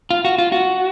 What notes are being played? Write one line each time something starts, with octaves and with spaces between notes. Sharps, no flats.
F4
F#4
F4
F#4